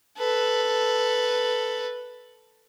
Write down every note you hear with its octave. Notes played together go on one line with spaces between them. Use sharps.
A4 B4